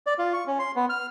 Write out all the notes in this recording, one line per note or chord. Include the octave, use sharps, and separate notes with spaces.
D5
F4
C#6
C#4
C6
B3
F6